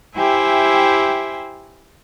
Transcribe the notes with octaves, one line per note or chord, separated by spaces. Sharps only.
E4 G4 C5 E5 G5 G#5